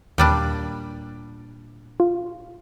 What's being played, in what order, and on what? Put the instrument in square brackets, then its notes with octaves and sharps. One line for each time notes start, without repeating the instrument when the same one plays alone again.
[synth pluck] D#2 [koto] A#2 G3 D4
[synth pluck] F4